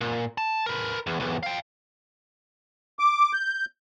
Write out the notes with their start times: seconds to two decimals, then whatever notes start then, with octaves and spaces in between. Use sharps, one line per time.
0.01 A#2
0.38 A5
0.66 A#4 B4
1.07 E2
1.20 B1 E2
1.43 F5 G5
2.99 D6
3.33 G6